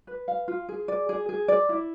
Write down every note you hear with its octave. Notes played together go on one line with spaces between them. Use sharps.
B4
F5
F4
G#4
D5
G#4
G#4
D5
E4